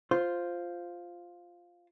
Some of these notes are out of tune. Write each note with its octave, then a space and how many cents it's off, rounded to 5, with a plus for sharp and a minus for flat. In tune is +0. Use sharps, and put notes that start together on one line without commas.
F4 +0 C5 +0